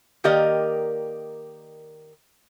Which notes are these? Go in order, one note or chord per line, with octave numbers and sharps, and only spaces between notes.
D#3 A#3 G4 A#4 D5 D#5